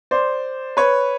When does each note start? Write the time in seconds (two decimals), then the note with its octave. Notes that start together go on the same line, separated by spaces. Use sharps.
0.11 C5 D5
0.77 B4 C#5